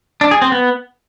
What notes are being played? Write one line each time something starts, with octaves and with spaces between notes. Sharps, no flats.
D4
G#4
C4
B3